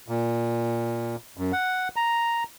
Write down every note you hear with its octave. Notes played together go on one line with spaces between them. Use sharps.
A#2
F#2
F#5
A#5